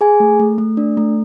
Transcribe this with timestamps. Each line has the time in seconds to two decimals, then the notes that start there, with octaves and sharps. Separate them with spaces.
0.01 G#4 G#5
0.20 A3
0.40 A3
0.58 A3
0.77 D4
0.97 A3